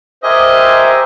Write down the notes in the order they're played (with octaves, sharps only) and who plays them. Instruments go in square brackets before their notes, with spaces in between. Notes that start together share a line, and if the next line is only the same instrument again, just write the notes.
[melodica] G4 A#4 G#5 [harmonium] C5 E5 [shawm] D#5